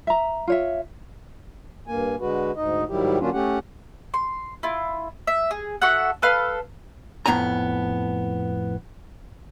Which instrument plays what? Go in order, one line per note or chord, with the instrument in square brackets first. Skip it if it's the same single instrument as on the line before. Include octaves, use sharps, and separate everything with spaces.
[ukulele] E5 A#5
F4 C#5 E5
[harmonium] G2 A#3 G#5
D3 G#3 F#4 B4
D2 G#2 D#4 D#5
G#2 D#3 F#3 G3 E4 G4
D3 F#3 A#3 C#4 D4 F4
A3 C#4 G4 F#5
[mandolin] C6
E4 F4
E5
G#4
F#4 A4 E5 F#5
A4 B4 F5 F6
[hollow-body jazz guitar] F2 A2 B3 G#5 A#5